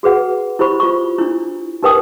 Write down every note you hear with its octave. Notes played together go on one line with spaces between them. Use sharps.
F#4 G#4 B4 F#5
E4 G4 C5 B5 C#6
F4 C#6
D4 E4
D#4 G4 A#4 B4 G5 D#6